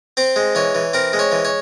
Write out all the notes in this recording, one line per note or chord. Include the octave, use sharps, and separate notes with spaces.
C4 C5
G#3
E3 C#5
E3
C4 A#4
G#3
C#5
E3
C#5